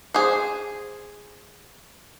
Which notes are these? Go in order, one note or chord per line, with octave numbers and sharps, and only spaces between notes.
G#4 C5